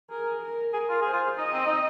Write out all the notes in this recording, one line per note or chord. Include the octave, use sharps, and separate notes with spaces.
G#4 A#4
A#4
G#4 A#4
F4
G#4 C5
F4
D#4 D#5
C4
D#4